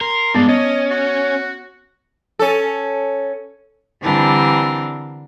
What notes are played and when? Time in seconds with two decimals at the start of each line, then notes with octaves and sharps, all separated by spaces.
0.01 A#4 C6
0.35 G2 G#3 B3 D5
0.48 C#4 D#5
0.91 F#4
2.39 C#4 A4
4.02 D3 E3 G3 C4 D4 A#4